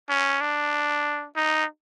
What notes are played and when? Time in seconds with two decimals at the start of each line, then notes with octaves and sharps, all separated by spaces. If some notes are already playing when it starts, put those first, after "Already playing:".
0.09 C#4
0.41 D4
1.36 D#4